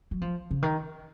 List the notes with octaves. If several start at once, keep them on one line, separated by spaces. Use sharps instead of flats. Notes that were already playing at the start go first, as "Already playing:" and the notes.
F#3
F3
C#3
D#3